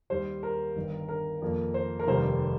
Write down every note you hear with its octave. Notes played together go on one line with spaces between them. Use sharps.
D#2 D#3 G3 C5
A#4
G1 G2 D#3
A#4
F2 D#3 A#3
C5
A#4
F1 D#2 D#3 G3 C5